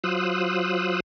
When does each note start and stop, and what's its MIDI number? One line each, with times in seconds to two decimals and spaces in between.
0.04 1.00 54
0.04 1.00 65
0.04 1.00 72
0.04 1.00 87
0.04 1.00 88
0.04 1.00 90